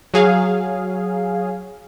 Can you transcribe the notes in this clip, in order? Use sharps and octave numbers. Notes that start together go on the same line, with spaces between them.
F#3 G#4 F5